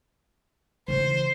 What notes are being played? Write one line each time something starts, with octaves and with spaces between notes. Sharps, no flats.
C#3 E3 C5